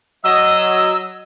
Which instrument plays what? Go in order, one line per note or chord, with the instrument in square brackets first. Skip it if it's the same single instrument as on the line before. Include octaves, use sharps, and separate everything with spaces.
[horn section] F#3 D#5 [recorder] E6